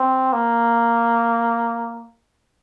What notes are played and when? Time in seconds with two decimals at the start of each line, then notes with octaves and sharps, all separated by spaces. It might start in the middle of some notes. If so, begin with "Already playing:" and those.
Already playing: C4
0.33 A#3